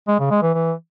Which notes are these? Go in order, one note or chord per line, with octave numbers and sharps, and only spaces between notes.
G#3
C#3
G#3
E3
E3